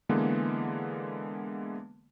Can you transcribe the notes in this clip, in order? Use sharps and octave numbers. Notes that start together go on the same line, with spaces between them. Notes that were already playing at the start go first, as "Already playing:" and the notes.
D3 E3 G#3 A#3 B3